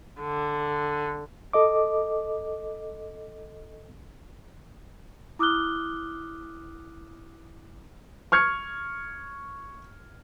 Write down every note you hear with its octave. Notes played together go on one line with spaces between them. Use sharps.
D3
A4 D#5 D6
E4 D6 D#6 F6 F#6 G7
C#6 F6 G#6 C#7